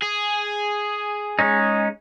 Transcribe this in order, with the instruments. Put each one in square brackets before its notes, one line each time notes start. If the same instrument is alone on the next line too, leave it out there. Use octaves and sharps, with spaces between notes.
[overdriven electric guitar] G#4
[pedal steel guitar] G#3 C#4 D#4